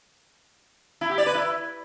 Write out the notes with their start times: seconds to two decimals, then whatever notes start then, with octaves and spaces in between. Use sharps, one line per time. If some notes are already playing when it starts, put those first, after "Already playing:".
1.01 E4
1.10 G4
1.18 D5
1.26 B4
1.35 E4